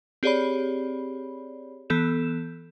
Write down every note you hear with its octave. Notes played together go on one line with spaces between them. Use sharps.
C4 G4 G#4 C#5 D5 B5
E3 B3 A4 G6 E7